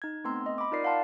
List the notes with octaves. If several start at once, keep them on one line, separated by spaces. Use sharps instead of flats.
D#4 G#6
A3 B3 C4 A#5 C6 E6
D#5
B5 D6
D#4 F4 A#4 D5 C7
F5 F#5 A5 C6